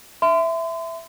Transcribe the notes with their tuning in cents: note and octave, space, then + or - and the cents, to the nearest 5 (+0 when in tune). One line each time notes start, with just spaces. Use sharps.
E5 +5 C6 -35